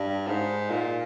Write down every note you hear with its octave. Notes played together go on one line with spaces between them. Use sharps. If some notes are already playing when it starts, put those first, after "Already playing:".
Already playing: G2
G#2
A#2